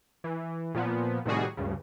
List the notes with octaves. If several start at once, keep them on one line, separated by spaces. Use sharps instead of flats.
E3
A#2 F3 B3
A2 C3 D#3 G3 F#4 G#4
D2 G2 C#3